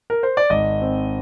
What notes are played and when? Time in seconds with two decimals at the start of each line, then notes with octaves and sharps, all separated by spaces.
0.10 A#4
0.23 C5
0.37 D5
0.50 G#1 D#5
0.81 C4